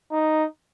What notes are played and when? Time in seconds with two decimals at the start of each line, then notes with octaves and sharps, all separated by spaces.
0.12 D#4